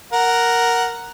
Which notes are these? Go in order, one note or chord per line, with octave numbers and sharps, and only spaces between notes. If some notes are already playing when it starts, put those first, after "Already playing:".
A#4 F#5